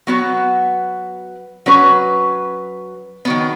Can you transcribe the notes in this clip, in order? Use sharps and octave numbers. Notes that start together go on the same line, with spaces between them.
F#3 B3 F#4 B4
F#3 C#4 B4
D#3 F#3 B3